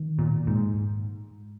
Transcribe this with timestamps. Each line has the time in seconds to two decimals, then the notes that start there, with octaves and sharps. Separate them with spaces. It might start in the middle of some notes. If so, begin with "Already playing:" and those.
Already playing: D#3
0.19 A#2
0.47 G#2